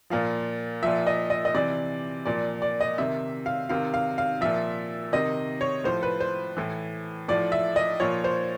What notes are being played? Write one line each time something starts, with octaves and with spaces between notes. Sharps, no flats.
A#2 F3 F5
A#2 F3 E5
D#5
D#5
D#5
C3 E3 D5
A#2 F3 D5
D5
D#5
C3 D#3 E5
F5
C3 D#3 F5
F5
F5
A#2 F3 E5
C3 D#3 D#5
C#5
A2 F3 C5
B4
C5
A2 E3
A2 F3 D5
E5
D#5
A#2 F3 C#5
C5